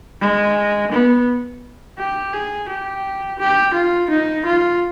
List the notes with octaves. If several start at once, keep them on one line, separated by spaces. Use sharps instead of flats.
G#3
B3
G4
G#4
G4
G4
F4
D#4
F4